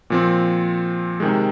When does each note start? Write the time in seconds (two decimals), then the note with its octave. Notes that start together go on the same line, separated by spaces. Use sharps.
0.10 A#2 F3 C4
1.20 C3 D#3 G#3